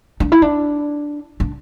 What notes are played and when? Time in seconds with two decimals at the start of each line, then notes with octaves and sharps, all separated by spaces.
0.20 D4
0.32 E4
0.42 D4
1.40 D4